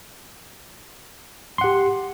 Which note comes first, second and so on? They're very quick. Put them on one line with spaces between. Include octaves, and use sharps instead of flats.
C6 F#5 G4